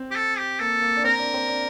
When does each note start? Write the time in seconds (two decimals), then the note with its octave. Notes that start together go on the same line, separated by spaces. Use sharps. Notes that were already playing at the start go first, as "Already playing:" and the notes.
Already playing: C4
0.11 G4
0.16 A4
0.38 G4
0.60 A#3 A4
0.82 A#3
0.96 D4
1.04 C4 A#4
1.19 D4
1.34 C4
1.48 D4